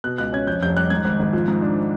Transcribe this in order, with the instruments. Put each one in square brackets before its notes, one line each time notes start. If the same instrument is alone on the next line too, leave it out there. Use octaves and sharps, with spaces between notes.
[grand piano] B2 F#6
C#2 F#6
C#4 G#6
F2 G6
F1 G6
G3 F#6
G#2 G#6
G#1
G#1
F3
G#2
D4